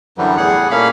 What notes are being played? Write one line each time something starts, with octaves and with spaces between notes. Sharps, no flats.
F#2 D3 E3 F#3 G3
E2 A2 G3 G#4 F#5
A#2 A3 A#3 C#4 F5 B5